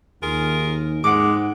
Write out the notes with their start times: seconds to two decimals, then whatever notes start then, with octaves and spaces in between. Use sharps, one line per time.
0.23 D#2 F4 G#4 A#4
1.04 F2 G#2 G#3 F#5 D6